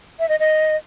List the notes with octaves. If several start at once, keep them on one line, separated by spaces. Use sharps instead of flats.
E5
D#5
D#5